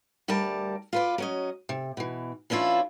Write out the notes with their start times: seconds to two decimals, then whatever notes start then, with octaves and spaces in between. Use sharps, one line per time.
0.28 D2 G3 A#4 D5 A5
0.93 F4 B4 D5
1.18 F#3 C#4 D#5
1.69 C3
1.97 B2 E3
2.50 E3 C#4 D4 E4 F4